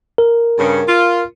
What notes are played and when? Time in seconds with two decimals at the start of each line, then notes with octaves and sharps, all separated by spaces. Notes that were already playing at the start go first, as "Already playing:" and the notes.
0.18 A#4
0.59 G2 C#3
0.88 F4